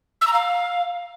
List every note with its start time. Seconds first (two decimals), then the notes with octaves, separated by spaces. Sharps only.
0.21 E6
0.27 A#5
0.33 F5